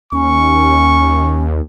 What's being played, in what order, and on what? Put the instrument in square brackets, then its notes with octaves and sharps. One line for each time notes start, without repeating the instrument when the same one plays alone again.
[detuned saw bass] D#2 [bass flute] C#4 [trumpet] C#6